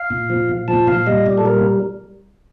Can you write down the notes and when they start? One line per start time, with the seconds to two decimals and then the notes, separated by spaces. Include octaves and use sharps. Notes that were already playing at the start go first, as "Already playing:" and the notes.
Already playing: F5
0.10 A#2
0.30 F3
0.49 A#2
0.68 F3 A5
0.87 A#2 F5
1.07 G3 D#5
1.26 A#2 D5
1.38 A4
1.45 G3 A#4